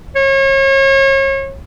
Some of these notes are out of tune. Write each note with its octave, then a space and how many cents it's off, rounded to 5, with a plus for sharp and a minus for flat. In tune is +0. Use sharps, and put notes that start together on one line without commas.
C#5 -35